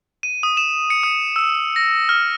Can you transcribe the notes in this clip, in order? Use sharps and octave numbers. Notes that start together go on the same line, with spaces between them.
D#7
D#6
E7
C#7
D#6
E6
A#6
F6